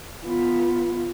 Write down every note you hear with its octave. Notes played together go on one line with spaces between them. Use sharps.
B3 F4